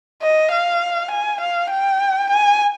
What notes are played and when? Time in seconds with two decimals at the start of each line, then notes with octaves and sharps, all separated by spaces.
0.22 D#5
0.52 F5
1.11 G#5
1.41 F5
1.70 G5
2.30 G#5